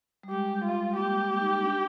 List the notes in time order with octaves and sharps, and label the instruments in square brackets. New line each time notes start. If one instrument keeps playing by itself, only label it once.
[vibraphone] G3
[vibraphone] G#3 [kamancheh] G4
[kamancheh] F4
[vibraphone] A#3 [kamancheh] G4
[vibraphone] A#3
D#4
D4